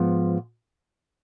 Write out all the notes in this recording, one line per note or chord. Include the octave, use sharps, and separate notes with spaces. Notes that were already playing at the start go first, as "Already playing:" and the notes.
Already playing: G#2 F3 B3